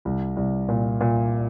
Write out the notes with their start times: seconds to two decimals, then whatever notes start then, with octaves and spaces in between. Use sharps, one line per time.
0.05 C2
0.36 C2
0.69 A#2
1.01 A#2